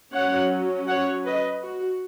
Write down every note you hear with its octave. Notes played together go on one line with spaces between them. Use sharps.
F#3 C#4 C#5 F#5
C#5 F#5
B4 D#5
F#4